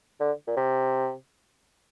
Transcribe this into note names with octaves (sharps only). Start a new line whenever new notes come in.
D3
A#2
C3